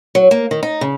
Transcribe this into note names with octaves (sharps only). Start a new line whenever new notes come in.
F#3
A#3
D#3
D#4
C#3